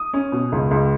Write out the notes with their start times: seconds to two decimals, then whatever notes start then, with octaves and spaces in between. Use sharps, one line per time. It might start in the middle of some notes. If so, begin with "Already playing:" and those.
Already playing: D#6
0.13 C#4
0.32 B2
0.52 C#2
0.71 C#2